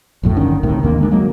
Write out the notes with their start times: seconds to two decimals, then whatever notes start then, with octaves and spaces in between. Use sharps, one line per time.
0.23 A#1 F#2 A2 A3
0.36 G1 D3 D#3 C#4
0.63 C2 A2 C3 D#3
0.83 A1 D#2 A#3 D4
0.98 D3 G#3 D4
1.11 F#3 G#3 A#3